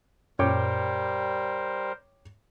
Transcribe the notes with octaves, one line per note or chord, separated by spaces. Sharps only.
F#2 A#2 G3 A#4 C5 C#5 G5 D6